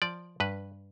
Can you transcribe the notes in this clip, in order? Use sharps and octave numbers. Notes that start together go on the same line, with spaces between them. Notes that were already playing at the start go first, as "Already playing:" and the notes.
F3 D5
G2 B4